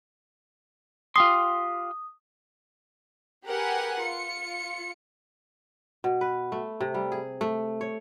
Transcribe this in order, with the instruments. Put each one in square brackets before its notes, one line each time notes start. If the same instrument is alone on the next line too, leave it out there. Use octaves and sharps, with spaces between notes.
[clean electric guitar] F4 G4 C6 [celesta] D#6
[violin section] G4 G#4 A#4 B4 F#5 G#5
F4 C#7
[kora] B2
B4
A3
C3
G3
G#4
A3
C#5